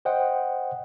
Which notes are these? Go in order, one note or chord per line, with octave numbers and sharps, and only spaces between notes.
C5 D#5 F#5 G5